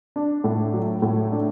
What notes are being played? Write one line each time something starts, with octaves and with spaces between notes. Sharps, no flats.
D4
A2
F#3
A2
D4